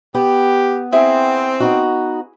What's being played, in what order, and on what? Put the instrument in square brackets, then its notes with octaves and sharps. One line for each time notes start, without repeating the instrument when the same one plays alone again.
[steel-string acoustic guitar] B3 [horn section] G4
[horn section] C4 [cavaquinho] E4 G#4
[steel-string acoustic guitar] B3 D#4 F#4